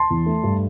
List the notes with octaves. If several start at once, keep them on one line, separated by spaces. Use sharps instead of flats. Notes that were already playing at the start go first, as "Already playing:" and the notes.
Already playing: A5 C6
E2
A3
G2